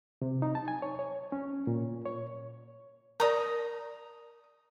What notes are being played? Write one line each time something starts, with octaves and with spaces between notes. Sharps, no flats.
C3
D#4
A5
G#5
C#5
C#5
C#4
A#2
C#5
A#4 D5 A#5 D#6